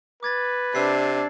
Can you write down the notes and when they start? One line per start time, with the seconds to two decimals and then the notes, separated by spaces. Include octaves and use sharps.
0.23 B4 D6 G#6 A6
0.75 C3 D4 E6 C7